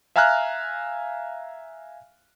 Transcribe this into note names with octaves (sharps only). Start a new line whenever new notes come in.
E5 F5 G#5 A#5 F6 F#6